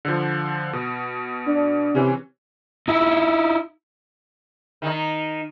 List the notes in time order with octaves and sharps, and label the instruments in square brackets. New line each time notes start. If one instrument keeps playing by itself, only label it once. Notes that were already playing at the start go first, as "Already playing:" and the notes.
[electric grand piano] D3 F3
B2
[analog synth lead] D4
[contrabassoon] C3 [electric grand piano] E3 C#4
[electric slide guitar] D#4 E4
[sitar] D#3 D#4